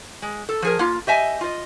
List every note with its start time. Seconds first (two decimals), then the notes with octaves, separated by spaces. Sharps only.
0.22 G#3
0.49 A4
0.62 F3 G#4 A#4
0.79 A#3 F4
1.07 G4 D#5 E5 G#5
1.41 F4 D#5